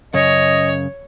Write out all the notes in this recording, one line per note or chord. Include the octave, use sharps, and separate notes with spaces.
F#2 C#3 C#5 D#5